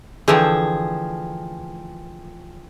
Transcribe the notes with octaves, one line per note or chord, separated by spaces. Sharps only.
D3 E3 F3 A3 G#4 G5 G#5